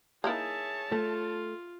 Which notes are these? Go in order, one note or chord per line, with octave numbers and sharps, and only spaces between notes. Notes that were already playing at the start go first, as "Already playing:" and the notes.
A#3 D#4 E4 G#4 C#5 E5 A5
A3 F4